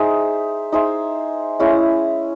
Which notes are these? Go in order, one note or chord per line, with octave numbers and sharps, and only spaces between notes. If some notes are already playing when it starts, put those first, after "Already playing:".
Already playing: D#4 G#4 C5 E5
D#4 G#4 C5 E5
G#3 C#4 E4